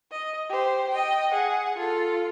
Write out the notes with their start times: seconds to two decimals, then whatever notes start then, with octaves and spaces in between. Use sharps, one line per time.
0.11 D#5
0.49 G4 C5
0.90 D#5 G5
1.32 G#4 F#5
1.78 F4 A4